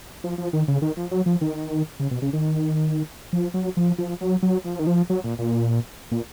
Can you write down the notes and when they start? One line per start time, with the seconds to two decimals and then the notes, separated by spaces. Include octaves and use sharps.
0.24 F3
0.38 F3
0.53 D#3
0.68 C#3
0.82 D#3
0.97 F3
1.11 F#3
1.26 F3
1.41 D#3
2.00 C#3
2.11 B2
2.22 C#3
2.33 D#3
3.33 F3
3.54 F#3
3.77 F3
3.98 F3
4.21 F#3
4.43 F#3
4.64 F3
4.79 D#3
4.87 F3
5.10 F#3
5.24 A#2
5.39 A#2
6.11 A#2